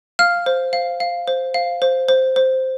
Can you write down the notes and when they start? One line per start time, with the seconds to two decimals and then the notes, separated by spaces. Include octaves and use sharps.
0.19 F5 F6
0.46 C5
0.73 F5
1.00 F5
1.28 C5
1.54 F5
1.82 C5
2.09 C5
2.36 C5